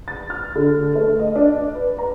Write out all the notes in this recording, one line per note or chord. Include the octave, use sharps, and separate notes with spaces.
A6
F6
D3
A3
D#5
D4
B4
A#5